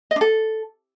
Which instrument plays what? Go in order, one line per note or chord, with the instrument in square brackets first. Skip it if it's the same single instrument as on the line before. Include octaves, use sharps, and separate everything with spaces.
[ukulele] D#5
D4
A4